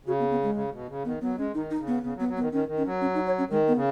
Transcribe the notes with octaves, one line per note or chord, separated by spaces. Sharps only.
C#3 F#4
B3
B3
G#3
C#3
B2
C#3
D#3 B3
F#3 B3
G#3 C#4
D#3 D#4
D#4
C#3
B3
C#3 B3
F#3
B3
F#3
B3
D#3
D#3 C#4
D#3
C#4
F#3
C#4
D#4
C#5
C#4
D#3 G#3
B3
C#3